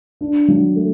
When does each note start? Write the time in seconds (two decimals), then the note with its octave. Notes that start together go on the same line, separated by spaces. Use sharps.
0.21 D4
0.48 F#3
0.76 A3